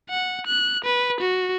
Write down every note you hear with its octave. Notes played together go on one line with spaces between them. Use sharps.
F#5
F#6
B4
F#4